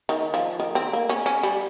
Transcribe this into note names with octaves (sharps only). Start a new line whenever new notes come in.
D#3
F3
D#3
C4
A#3
C#4
C#4
G3